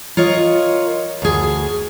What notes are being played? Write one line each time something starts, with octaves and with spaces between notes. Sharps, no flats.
F4 A#4 C#5 D#5
D2 G#4